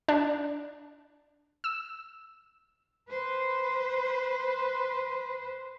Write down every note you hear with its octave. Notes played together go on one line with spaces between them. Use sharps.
D4
E6
B4 C5